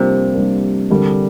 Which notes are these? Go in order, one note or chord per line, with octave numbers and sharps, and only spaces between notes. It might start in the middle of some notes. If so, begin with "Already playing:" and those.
Already playing: C3 F3 G3 A#3 D4 A#4
G3 A#3 D4 A#4
D3 G3 D4 A#4